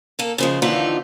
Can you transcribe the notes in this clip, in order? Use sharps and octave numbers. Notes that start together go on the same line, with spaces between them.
A#3 A4
C#3 F3 G#3
D#2 D3 E3 F3 D#4 F4